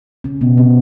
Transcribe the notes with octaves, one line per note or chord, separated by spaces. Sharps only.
C#3 C#4
B2 B3
C3 C4